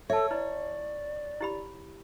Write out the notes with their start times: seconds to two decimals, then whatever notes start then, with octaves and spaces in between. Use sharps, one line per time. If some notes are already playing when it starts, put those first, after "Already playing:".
0.10 A4 C#5 E5 A5
0.31 E4 B4 D5
1.41 E4 G4 B5